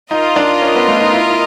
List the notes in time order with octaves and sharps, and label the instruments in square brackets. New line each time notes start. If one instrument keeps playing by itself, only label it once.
[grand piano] D#4 [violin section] F4 A#4 D#5
[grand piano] D4
C#4
B3
A3
D#4
E4
E4